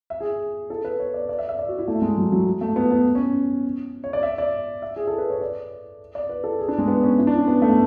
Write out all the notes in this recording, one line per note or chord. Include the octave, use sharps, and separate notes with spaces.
E5
G#4
A4
B4
C#5
D5
D5
E5
E5
D5
F#4
E4
A3
G#3
F#3
F#3
A3
B3
B3
C#4
C#5
D5
E5
D5
E5
G#4
A4
B4
C#5
D5
D5
B4
A4
G#4
D4
G#3
B3
C#4
E4
D4
C#4
B3
A3